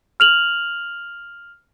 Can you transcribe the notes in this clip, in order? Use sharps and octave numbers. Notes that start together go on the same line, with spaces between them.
F6 F7 F#7